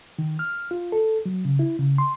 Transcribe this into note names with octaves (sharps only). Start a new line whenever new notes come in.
D#3
F6
F4
A4
F#3
C#3
E4
C#3
C6